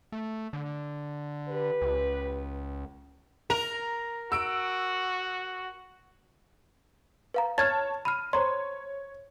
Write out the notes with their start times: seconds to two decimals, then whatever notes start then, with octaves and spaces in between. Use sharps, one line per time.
0.12 A3
0.53 D3
1.49 G4 B4
1.82 C#2
3.50 A#4 A#5 F7
4.32 F#4 E6 D7
7.34 B4 F5 A#5
7.58 C#5 A5 F6 G#6 A6
8.05 B5 F6 D#7
8.33 C5 C#5 A#5 C6